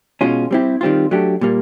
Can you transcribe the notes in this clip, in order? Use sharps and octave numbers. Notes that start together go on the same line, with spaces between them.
B2 G#3 C#4 F4
G3 C4 E4 G4
D#3 G3 C4 F4
F#3 A3 D4 G4
A#2 G3 A#3